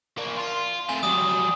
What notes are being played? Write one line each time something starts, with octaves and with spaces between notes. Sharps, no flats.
A#3 D4
F4
C3 A3 G#5
F#3 G3 D#6